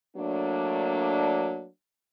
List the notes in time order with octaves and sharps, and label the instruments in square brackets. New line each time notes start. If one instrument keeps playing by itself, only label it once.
[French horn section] F#3 A3 A#3 D4